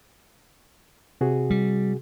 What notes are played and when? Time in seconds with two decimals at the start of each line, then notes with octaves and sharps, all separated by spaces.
1.21 C3 F#4 G#4
1.50 G3